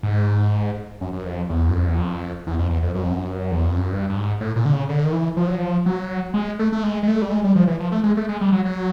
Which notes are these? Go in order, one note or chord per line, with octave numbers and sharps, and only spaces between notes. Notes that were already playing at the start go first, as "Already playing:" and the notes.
G#2
F#2
F#2
F2
E2
F#2
F2
E2
F2
E2
F2
E2
F2
F#2
F2
F#2
E2
F2
F#2
G2
G2
G#2
A2
A#2
D3
C#3
D3
D#3
E3
F3
F#3
F3
F#3
G#3
A3
A3
G#3
G#3
A3
G3
G#3
G3
F3
E3
F3
A3
G#3
A3
G#3
G3
F#3
F#3